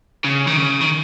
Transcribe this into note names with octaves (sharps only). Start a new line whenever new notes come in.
C#3
D#3
C#3
D#3